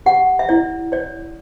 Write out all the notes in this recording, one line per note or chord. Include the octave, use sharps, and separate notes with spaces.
G4 F#5
E5
E4 D5
C#5 D5